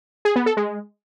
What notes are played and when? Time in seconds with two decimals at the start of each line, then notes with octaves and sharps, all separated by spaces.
0.25 G#4
0.36 B3
0.46 A4
0.57 G#3